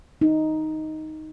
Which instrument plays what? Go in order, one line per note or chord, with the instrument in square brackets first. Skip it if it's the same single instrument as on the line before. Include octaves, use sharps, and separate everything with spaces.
[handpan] D#4